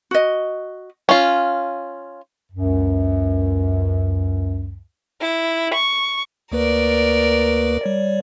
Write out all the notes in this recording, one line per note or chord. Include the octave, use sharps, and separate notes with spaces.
F#4 D#5
C#4 F4
C#2 F#2
E4
C#6
D2 A#3 A#4 B4 D5
G3 C#5 D5